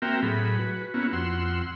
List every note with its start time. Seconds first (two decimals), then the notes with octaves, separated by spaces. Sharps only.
0.02 A#3 C4 F#4 A#4 E5 G5
0.23 A2 F#3 G#4 B5
0.59 F#4 B4
0.94 A#3 B3 C#4 E4 F#4
1.13 F2 F#5 C6 E6